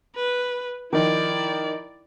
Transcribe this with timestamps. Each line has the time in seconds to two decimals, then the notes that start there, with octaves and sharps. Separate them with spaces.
0.16 B4
0.93 D#3 F3 D#4 E4 D5